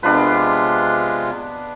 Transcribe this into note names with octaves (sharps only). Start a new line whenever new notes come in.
C3 G#3 B3 D4 F4 B4